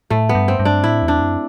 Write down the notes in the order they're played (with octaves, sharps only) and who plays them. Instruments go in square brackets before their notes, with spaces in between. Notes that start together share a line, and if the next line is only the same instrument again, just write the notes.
[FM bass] A2 [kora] A3
[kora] B3
[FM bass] G2
[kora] C4
[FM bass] G2
[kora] D4
[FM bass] A2 [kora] E4
[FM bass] E2
[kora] D4
[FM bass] F#2